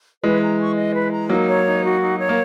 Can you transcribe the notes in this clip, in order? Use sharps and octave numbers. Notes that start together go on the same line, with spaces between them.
E3 G#3 B4
A#5
C#6
D#5
B4
A#5
F#3 A#3 D#4
C#5
D#4
F#4
D#4
C#5
A#3